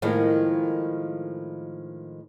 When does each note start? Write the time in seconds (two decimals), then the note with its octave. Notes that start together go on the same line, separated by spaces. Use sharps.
0.02 A2 D#3 F3 G#3 A#3